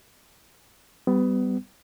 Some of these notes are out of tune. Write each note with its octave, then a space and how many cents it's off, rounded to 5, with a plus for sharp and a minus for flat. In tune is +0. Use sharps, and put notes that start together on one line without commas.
G3 -10 B3 +25